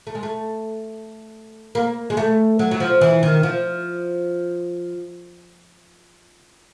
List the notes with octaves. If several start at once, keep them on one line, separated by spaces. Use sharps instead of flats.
A3
G#3
A3
A#3
G#3
A3
F#3
F#3
F3
E3
D#3
F3